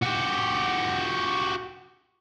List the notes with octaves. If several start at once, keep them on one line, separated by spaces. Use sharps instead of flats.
F#4 G4